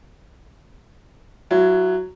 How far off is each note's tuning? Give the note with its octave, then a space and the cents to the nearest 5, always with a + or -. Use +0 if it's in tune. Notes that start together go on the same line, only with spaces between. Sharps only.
F#3 +0 E4 +30